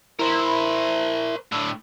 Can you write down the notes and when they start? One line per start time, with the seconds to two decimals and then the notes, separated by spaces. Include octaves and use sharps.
0.19 E4 A#4 C5
1.52 A2 D3